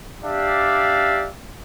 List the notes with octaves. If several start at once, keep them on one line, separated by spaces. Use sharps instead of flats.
D4 G4 D5 E5 F5